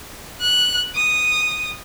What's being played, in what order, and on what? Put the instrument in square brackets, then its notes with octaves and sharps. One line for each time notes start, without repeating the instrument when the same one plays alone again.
[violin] F#6
D#6